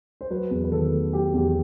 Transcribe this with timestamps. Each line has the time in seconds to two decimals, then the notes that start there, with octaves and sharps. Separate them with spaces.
0.21 C5
0.30 F#3 B4
0.51 E2
0.64 B4
0.72 D#3 A4
0.93 A3
1.13 F#3 G4
1.33 E2 G4